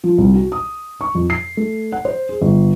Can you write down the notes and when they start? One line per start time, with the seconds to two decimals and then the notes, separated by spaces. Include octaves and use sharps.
0.04 F3
0.18 C2
0.34 F#4
0.52 D#6
1.01 C#6
1.15 F2
1.30 C7
1.57 A3
1.92 F#5
2.05 C5
2.29 G#4
2.41 G1